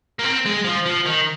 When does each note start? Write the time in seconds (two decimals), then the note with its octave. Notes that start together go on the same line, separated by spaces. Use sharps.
0.19 A#3
0.24 C4
0.45 G#3
0.64 F3
0.85 F3
1.06 D#3